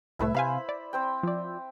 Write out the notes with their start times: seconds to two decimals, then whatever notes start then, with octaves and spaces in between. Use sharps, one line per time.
0.19 C2 A2 A3 E4 B4 E6
0.34 C3 C5 F5 G#5 B5
0.69 D5
0.93 C4 C5 G5
1.23 F3 D5